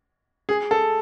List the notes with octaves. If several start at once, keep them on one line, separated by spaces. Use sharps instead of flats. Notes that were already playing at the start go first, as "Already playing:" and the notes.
G#4
A4